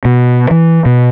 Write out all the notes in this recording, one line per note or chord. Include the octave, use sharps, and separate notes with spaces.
B2
E3
B2